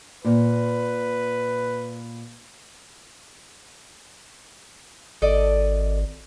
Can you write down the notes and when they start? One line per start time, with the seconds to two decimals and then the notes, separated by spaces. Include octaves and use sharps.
0.25 A#2 B4
5.22 G#1 A4 D5 D#5